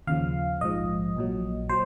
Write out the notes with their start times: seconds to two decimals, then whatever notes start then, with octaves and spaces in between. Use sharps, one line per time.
0.07 D#2 C#3 F3 F5
0.61 A#1 G#2 F3 D#5
1.17 A#1 A#2 F#3
1.69 A#2 F#3 C5